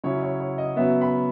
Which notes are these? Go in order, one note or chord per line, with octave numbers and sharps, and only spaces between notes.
C#3 F#3 C#4 E4 C#5
C#5
C#5
D#5
C#3 F#3 B3 E5
B5